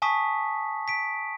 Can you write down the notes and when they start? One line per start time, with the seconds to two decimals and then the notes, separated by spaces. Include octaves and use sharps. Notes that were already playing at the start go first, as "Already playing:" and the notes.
0.02 G#5 A5 C#6 D#6 B6
0.88 B6 D7